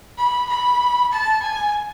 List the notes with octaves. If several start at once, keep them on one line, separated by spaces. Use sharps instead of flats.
B5
B5
A5
G#5